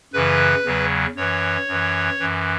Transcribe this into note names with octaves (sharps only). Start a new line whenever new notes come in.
F#2 C#3 E3 B4
E2 C#3 F#3
F#2 E3 C#5
F#2 E3
F#2 E3